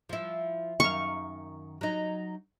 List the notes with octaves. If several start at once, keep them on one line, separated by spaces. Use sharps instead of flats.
F3 E4
F#2 D#3 F5 C#6
F#3 D#4